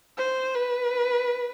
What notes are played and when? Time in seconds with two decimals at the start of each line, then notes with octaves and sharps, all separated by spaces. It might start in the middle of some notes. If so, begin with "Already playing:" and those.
0.18 C5
0.55 B4